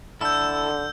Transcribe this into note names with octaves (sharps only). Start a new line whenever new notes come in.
D3 E4 A4 E6 G6